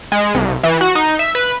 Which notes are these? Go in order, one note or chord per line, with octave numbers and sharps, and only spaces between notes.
G#3
C2
E3
F#4
D#4
E5
B4